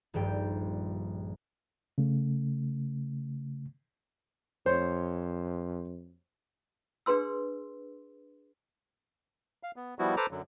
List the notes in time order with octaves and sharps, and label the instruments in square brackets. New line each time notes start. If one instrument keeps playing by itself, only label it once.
[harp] D#1 A#1 G2 G5
[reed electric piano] C#3 A3
[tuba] F2 [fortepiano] C5 C#5
[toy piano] D4 G#4 B4 C6 E6
[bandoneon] F5
B3
F3 G3 B3 E4 F#4
A4 B4 C5 A#5 D6
F#2 D3 F#3